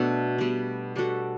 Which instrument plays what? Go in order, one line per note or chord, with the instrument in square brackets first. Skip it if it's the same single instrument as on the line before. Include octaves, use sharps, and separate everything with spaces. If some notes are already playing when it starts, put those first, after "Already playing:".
Already playing: [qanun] B2 A3 D4 A4
B2 G3 D4
G3 D4 F#4 A4